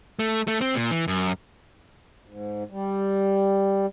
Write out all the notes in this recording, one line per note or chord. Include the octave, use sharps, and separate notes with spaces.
A3
A3
C4
A#2
E3
F#2
G#2
G3